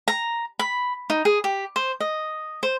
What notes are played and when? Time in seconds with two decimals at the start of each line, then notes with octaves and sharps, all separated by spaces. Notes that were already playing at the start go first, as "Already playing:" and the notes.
0.08 A#5
0.59 B5
1.10 D#4
1.25 G#4
1.44 G4
1.76 C5
2.00 D#5
2.63 C5